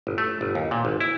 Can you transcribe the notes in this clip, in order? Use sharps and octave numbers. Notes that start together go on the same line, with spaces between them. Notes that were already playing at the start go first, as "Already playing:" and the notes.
G1
A3
G1
D#2
A#2
G#1
E4